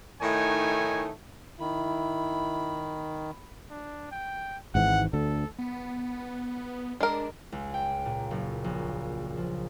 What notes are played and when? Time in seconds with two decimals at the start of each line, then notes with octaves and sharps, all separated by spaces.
0.22 A2 D#3 A3 D#4 C#5 G#5
1.60 D#3 E4 B5
3.71 D4
4.12 G5
4.75 G#1 G#2 E3 F#5
5.13 D2 D3 A4
5.59 B3
7.01 G#3 D4 A#4
7.52 C#2
7.74 G5
8.06 A#2
8.31 F#1
8.64 A#1
9.37 F3